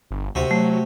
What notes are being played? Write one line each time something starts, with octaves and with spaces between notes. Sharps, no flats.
G1
D2 C3 F#4
F#3 A3